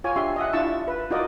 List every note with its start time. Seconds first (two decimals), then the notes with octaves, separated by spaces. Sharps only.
0.04 F4 C#5 G#5
0.16 D4 G4 E5 C6
0.36 D#5 E5 F#5
0.53 D4 E4 F4 A5 C#6 E6
0.88 B4
1.11 D#4 F4 F#4 A#4 D5 D#5